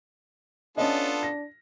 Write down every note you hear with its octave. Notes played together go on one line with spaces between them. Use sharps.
B3 C#4 D4 F4 A4 D#5
A#6